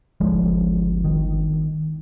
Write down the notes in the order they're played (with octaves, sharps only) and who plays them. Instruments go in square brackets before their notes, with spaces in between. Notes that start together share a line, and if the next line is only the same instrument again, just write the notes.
[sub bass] G1 [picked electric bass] C#2 F3 G#3
[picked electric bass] D#3